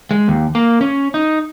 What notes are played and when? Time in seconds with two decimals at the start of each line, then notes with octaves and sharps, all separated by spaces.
0.11 G#3
0.28 D#2
0.55 A#3
0.81 C#4
1.14 D#4